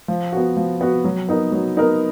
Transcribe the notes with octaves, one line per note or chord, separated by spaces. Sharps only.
F3
B3 F#4
F3
B3 F#4
F#3
B3 D#4 A#4
F#3
B3 D#4 A#4